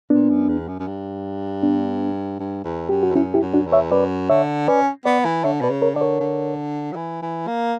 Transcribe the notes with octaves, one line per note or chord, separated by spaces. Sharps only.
A#2 B3 D4
F#2
E2
F#2
F#2
G2
B3 D4
G2
E2
F#2 G4
F#4
E2
F#2 C#4 E4
E4 G4
F#2
D4 F#4
E2
C#5 E5
F#2 B4 D5
D3 C#5 E5
C#4 B4 D5
B3 B4 D5
E3
D3 C#5 E5
B2 B4 D5
C#3
A#4 C#5
D3 D5
A#4 C#5
D3
F#3
E3
E3
A#3